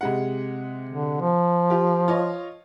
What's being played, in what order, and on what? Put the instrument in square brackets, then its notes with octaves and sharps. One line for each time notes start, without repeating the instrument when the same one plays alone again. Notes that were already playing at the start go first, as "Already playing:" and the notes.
[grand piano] C3 G#3 F#5
[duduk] D3
F3
[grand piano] F4 G4
F4 C#5 D#5